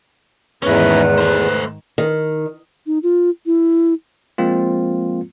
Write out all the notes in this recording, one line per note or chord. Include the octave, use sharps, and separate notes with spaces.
E2 G#2 D#3 C#4 E4 B4
A3 C5
D#3
D#4
F4
E4
F3 G#3 A#3 C4 F4